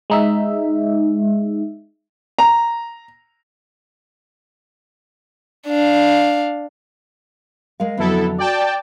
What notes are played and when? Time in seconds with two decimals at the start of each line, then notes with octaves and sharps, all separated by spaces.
0.10 G#3 D#4 E5
2.39 A#5
5.68 D4 F5
7.80 G#3 A#4 F5
7.98 F2 D3 F#3 B3 E4 A4
8.38 F#4 D5 G5 A5